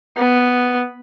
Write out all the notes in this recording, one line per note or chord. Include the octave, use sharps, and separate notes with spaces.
B3